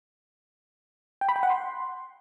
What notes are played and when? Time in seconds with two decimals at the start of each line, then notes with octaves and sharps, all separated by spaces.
1.21 G5
1.29 B5
1.36 G5
1.43 F#5
1.50 C6